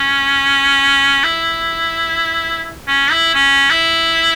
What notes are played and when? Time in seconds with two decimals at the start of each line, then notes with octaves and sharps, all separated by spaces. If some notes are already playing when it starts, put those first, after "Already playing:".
Already playing: C#4
1.23 E4
2.88 C#4
3.11 E4
3.35 C#4
3.70 E4